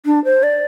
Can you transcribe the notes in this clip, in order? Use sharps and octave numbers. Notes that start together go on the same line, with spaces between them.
D4
C5
D5